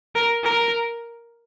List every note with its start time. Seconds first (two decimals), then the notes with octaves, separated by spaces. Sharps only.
0.15 A#4
0.44 A#4